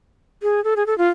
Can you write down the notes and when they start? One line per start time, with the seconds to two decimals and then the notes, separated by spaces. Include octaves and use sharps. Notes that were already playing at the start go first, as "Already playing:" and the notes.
0.43 G#4
0.64 A4
0.76 G#4
0.87 A4
0.98 F4